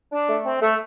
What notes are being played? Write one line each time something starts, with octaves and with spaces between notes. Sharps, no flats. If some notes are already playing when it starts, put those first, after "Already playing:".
D4
A3
C4
A3